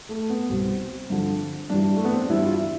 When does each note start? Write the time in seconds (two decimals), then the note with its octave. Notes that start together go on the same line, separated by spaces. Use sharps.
0.09 A3
0.30 B3
0.49 C2 B2 G3 C4
1.10 G2 D3 F3
1.70 G2 E3 G3 D4
1.96 A3
2.05 B3
2.13 C4
2.22 D4
2.30 G2 E3 G3 E4
2.46 F4
2.50 E4